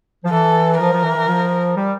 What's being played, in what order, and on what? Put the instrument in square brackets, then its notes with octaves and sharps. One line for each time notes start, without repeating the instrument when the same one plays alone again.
[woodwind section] F3
[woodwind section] E3 [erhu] A4
[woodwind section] F3 [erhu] A#4
[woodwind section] F3
E3
E3
F3
G3